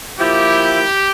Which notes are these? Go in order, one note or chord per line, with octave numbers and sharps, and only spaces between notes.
F3 A#3 E4 G4